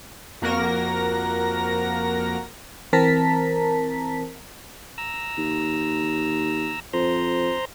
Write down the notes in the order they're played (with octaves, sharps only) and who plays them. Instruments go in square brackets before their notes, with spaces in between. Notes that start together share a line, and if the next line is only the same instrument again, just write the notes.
[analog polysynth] F2 A#3 F#4 A#4 A#6
[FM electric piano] E3 C4 A#4 A5 A#5 B6
[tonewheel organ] A#5 E6
[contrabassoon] D#2
[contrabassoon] F2 [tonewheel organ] C5 A#5 C6